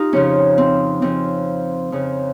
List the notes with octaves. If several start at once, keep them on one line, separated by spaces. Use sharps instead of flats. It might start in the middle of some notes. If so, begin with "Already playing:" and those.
Already playing: D#4 F4 G4
F2 C#3 F3 C#4
C4
F2 C#3 F3 C4
F2 C#3 F3